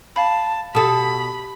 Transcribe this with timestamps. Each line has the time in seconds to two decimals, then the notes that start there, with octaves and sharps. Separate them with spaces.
0.16 F5 A5 B5
0.75 B2 G4 A4 A5 B5 D#6